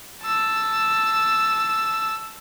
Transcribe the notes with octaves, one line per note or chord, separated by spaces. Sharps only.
A5 E6